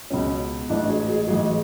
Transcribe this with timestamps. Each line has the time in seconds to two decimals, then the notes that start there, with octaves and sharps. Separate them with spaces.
0.10 C#2 B2 C#4
0.69 A1 G#2 E3 D4
0.90 G#4
1.09 G#4
1.28 A1 G#2 E3 G#4